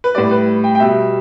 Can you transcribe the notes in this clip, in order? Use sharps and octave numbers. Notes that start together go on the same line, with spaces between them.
B4
A2 G3 D5
B4
G5
G5
B2 G3 E5